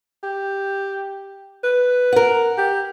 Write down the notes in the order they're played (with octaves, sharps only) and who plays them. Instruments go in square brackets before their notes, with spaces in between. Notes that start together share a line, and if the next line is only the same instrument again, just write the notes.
[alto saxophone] G4
B4
[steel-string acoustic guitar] A#4 F#5
[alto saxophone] G4